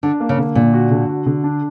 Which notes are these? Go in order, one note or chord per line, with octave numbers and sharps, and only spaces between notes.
D3 D4
A#3
C#3
D3
A#2 D3
F#4
D3
F#4
D3
D4